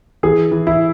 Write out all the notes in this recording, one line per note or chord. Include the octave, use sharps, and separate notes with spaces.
E3 G#4
E3
E4